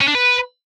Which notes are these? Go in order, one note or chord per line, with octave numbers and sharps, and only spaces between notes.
C#4
D4
B4